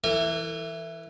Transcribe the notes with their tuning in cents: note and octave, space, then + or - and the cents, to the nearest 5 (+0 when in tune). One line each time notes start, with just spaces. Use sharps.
E3 +5 A4 +45 G#5 -35